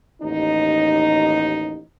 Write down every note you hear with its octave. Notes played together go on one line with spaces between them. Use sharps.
A1 D#2 D#4